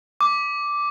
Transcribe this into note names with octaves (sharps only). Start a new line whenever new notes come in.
D6